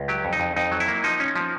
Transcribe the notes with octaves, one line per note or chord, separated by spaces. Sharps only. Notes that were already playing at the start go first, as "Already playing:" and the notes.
Already playing: C#2
F#3 G4
F2
D#4
F2
F2 D#4
F#3
E4
A#3
F3 D#4
C#4
F3